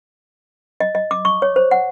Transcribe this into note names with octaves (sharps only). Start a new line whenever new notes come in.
D#5
D#5
D6
C#6
C#5
C5
F#5